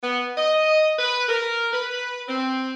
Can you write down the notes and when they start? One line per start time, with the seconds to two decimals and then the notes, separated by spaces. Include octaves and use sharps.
0.02 B3
0.37 D#5
0.99 B4
1.28 A#4
1.73 B4
2.28 C4